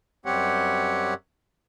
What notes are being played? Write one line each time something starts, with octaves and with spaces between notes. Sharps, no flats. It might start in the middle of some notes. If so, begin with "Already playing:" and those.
F#2 G3 C4 G4 C#5 F#5